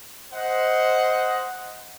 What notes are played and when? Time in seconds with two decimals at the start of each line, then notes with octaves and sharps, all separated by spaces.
0.33 C5 D#5 F#5